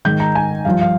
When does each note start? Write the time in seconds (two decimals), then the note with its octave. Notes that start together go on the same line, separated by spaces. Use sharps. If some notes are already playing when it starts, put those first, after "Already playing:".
0.05 G#2 D#3 G6
0.20 A#5
0.35 G#5
0.65 G2 F3 F5
0.81 F5